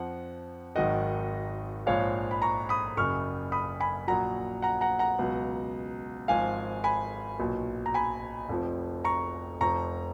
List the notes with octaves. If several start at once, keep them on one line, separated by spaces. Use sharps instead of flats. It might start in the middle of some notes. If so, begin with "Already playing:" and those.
Already playing: F2 F3 F#5
G#1 G#2 D#3 F#3 D#5 F#5
A#1 G#2 F3 C#5 F5
B5
A#5 C#6
B5 D#6
F#1 F#2 C#3 C#6 F6
B5 D#6
G#5 B5
A#1 A#2 F#3 F#5 A#5
F#5 A#5
F#5 A#5
F#5 A#5
C#2 B2 F#3
G#1 G#2 F3 F5 G#5
G#5 B5
B1 A#2 F#3
A#5
G#5 B5
F1 F2 F3
A#5 C#6
F1 F2 F3 A#5 C#6